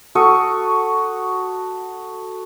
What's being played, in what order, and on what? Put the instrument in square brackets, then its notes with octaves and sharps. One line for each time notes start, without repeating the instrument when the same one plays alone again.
[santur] F#4 A4 C#6 D#6